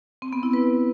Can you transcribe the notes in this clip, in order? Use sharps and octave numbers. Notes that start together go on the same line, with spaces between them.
C4
B3
E4
B4